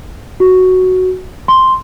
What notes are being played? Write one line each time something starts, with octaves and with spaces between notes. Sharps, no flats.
F#4
C6